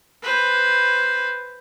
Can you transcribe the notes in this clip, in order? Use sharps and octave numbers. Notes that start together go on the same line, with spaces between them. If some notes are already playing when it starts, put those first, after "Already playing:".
B4 C5